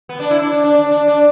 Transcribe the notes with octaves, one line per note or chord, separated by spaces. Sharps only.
B3
D4
E4
D4
D4
D4
D4
D4
D4